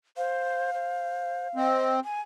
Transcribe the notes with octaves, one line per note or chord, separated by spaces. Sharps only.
C5 F5
C5
C4 D#5
G#5